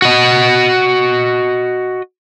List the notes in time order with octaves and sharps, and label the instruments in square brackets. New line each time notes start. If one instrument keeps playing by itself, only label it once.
[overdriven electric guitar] F#4 D#5